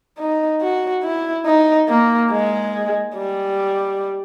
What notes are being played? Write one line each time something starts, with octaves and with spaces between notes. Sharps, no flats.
D#4
F#4
E4
D#4
A#3
G#3
G3